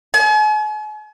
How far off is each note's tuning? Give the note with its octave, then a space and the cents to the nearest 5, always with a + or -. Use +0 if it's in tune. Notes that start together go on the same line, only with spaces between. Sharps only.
G#5 +40